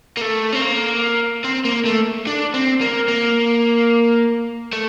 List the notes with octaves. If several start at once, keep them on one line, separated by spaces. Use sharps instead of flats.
A#3
A3
C4
A#3
C4
A#3
A3
D4
C4
A#3
A#3
A3